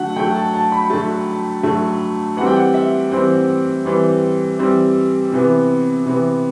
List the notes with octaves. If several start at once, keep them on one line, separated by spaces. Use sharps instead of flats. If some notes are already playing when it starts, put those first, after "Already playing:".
Already playing: D3 F#3 A3 F#5
D3 F#3 A3 G5
A5
A5
B5
D3 F#3 A3 A5
D3 F#3 A3
E3 G3 C4 F#5
G5
F#5
E5
E3 G3 C4 C5
E3 G3 C4
E3 G3 C4
C3 E3 B3
C3 E3 B3